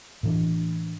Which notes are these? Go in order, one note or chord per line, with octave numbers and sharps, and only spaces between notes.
A2 E3 D4